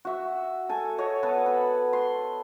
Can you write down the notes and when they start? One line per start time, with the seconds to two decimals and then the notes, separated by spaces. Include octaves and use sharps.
0.05 F#4 E5
0.69 A4 G#5
0.98 F#4 C#5 D#5
1.23 B3 A4 B4
1.46 B5
1.93 C6